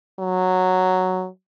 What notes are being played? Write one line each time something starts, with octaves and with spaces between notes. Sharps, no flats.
F#3